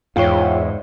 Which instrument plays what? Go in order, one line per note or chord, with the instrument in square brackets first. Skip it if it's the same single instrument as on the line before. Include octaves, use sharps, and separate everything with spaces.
[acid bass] E2 [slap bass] G#2 [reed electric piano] F4 C#5 [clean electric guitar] F5 G5